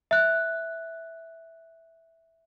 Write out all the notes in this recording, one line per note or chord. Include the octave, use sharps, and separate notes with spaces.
E5 F#6